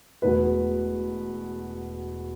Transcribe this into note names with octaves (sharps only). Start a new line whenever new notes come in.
E1 E2 B2 A3 B4